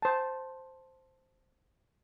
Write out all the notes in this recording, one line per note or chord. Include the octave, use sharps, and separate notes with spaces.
C5 A5